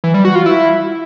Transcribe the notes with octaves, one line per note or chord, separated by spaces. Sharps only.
E3
G3
F#4
F4
E4